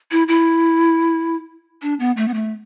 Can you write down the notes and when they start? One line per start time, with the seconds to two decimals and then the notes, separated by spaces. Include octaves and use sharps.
0.11 E4
0.28 E4
1.82 D4
2.00 B3
2.17 A3
2.28 B3
2.34 A3